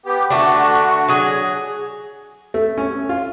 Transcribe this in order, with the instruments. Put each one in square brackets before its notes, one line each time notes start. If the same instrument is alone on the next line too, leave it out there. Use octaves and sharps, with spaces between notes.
[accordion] B3 G4
[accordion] D3 F#4 [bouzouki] A3 D4
[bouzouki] F#3 G#4
[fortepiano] A3
C#4
F4